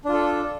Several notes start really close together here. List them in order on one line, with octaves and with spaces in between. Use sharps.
D4 F4 A4